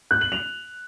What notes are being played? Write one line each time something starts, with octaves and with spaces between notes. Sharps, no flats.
F#6
F#7
F7